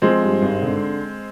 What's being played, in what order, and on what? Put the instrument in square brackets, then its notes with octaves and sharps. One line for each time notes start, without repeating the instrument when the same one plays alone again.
[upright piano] F3 [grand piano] G#3 C4
[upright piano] G2
G#1
D3